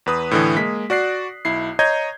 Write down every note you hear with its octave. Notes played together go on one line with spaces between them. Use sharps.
E2 B4 D#6
A2 D3 E3
G#3 A#3 B6
F#4 D5 F#6 C7
B1 E4 C7
C#5 D#5 A#5 G6 G#6